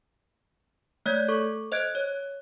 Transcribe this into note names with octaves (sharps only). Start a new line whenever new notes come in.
A3 C#5 D5 G6 G#6
A4 C#6
C5 D#5 F#6 G#6 D7
C#5